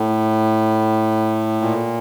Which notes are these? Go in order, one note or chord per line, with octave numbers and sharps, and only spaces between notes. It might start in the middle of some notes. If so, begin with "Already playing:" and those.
Already playing: A2
A#2